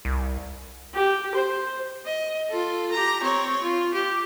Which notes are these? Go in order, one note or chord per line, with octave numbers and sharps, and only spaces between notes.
C2
G4
C5
D#5
F4 A4
G4 A#5
C4 C#5
F4
G4